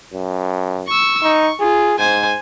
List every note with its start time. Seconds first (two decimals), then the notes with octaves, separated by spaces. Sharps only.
0.14 F#2
0.87 C#6 E6
1.23 D#4 C#6
1.60 F4 G#4
1.99 G#2 C5 G#5